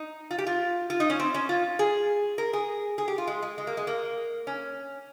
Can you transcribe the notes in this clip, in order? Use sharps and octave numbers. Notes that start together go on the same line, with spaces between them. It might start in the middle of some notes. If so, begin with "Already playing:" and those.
Already playing: D#4
F4
G4
F4
F4
D#4
C#4
C4
C#4
F4
G#4
A#4
G#4
G#4
G4
F4
G#3
G#3
G#3
A#3
G#3
A#3
C#4